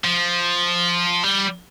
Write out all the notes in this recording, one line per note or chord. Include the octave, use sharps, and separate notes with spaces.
F3
G3